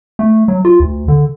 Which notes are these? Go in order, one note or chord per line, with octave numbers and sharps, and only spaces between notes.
A3
F#3
F4
D2
D3